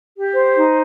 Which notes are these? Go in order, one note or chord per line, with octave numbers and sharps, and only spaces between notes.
G4
C5
D#4